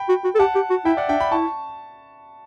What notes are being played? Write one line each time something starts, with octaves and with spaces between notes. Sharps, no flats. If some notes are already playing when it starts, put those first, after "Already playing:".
Already playing: G5 B5
F#4
F#4
A4
G4 F#5 A5
G4
F#4
E4 E5 G5
D5 F#5
D4 E5 G5
G5 B5
E4 A5 C#6